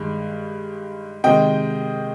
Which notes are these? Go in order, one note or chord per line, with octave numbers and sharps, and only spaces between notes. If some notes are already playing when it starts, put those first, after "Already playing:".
Already playing: G2 D#3 G#3
C3 D#3 G#3 D#5 G5